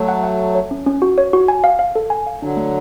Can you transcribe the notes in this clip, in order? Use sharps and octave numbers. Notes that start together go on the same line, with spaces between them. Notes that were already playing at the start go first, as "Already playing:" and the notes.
Already playing: F#3 A3
F#5
F#5
A5
C#5
C#4
C#4
F#4
C#5
F#4
G#5
F5
F5
A4
G#5
F5
D3 F#3 D4
A3